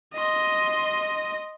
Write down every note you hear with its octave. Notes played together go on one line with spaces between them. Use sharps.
D#5 C6